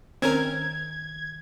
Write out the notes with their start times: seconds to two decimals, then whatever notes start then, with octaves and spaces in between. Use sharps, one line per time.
0.22 D#3 C4 C#4 A#4 G#6